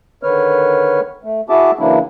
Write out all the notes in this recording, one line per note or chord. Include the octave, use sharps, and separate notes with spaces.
D3 D#3 B4 C#5 F6
A3
E4 F#4 G#4 E5 A5 D6
C#3 E3 F#3 A#3 D4 E4